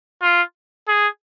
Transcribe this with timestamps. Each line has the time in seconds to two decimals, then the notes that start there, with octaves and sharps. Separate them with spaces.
0.22 F4
0.88 G#4